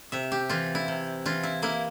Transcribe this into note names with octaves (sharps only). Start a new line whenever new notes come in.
C3 E5
G4
E3 F4
E4
C3
E3 F4
E4
A#3 E4